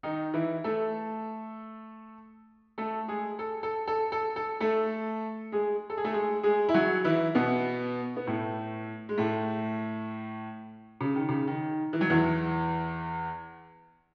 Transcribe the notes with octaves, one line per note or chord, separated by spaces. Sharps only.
D#3 D#4
E3 E4
A3 A4
A3 A4
G#3 G#4
A4
A4
A4
A4
A4
A3 A4
G#3 G#4
A4
G#4
A3 A4
G#3 G#4
G#3 G#4
E4
F#3 F#4
E3 E4
B2 B3
B3
A2 A3
G#3
A2 A3
C#3
D#3
C#3
D#3
E3
F#3
E2 E3